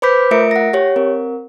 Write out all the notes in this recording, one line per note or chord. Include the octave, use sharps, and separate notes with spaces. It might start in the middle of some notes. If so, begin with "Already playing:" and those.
B4 C5 B5 D6 G6 B6
A3 F4 A#4 E5 C#7 D7
F#5 A#6
G4 C#5
C4 A#4